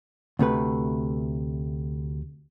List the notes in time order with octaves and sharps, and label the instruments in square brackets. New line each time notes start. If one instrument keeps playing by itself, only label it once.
[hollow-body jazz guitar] D2 C3 A3 B4